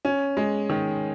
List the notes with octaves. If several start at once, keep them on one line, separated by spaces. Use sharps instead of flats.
C#4
G#3
D#3